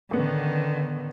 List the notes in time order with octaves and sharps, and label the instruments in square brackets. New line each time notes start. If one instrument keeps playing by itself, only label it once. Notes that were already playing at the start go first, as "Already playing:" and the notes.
[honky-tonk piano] A1 B3 [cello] D3 D#3